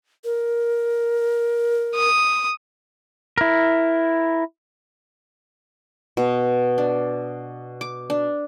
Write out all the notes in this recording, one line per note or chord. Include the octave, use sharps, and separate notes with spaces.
A#4
D#6
E4 A#4
B2
D4
D6
D4